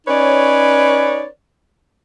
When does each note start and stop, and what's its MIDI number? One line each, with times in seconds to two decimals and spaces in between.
0.07 1.25 61
0.07 1.25 63
0.07 1.25 71
0.07 1.25 73
0.07 1.25 74